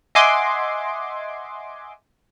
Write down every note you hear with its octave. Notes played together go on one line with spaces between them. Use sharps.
D#5 E5 F#5 G#5 C6 D6